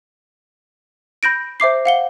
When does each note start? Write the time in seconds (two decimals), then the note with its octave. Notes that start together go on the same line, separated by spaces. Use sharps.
1.23 B5 G6 A#6 D7
1.60 C5 E5 D6 C7
1.85 F5 F#5 G7